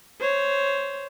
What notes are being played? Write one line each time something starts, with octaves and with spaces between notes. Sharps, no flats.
C5 C#5